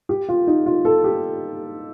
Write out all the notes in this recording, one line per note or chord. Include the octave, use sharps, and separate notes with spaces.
G4
F4
D#4
F4
A4
G4